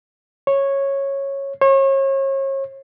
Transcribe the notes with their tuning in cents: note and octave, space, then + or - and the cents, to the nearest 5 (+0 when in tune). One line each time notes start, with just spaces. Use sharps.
C#5 -10
C#5 -35